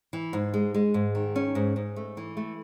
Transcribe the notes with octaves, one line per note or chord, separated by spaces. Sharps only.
E3
G#2
G#3
G#3
G#2
D#3
C#4
G#2
G#2
A3
E3
A3